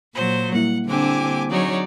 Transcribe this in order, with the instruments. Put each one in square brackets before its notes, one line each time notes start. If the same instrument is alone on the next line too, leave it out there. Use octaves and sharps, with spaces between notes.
[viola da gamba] A#2 [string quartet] F#3 C5
[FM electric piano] G3 A#3 E4 [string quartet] F#5
[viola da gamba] D3 C4 D4 [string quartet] G4 G#5 D6
[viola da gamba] F#3 D5 [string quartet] D#4 G#4 C#5